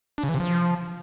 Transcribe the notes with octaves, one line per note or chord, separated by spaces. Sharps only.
D4
C#3
E3
C3
F3